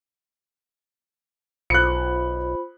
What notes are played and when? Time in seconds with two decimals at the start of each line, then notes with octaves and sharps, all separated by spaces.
1.70 B1 F4 C5 B5 F#6 C#7